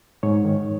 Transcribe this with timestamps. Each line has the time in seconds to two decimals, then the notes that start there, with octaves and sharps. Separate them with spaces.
0.23 G#2 C#5
0.45 D#3